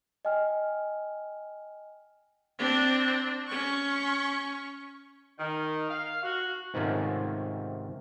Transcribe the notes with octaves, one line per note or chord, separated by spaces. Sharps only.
D#5 G5 G#5 F6
C4 D4
C#4 C#6
D#3
F5
F#4
G#2 C3 D#3 A3 C#4 F4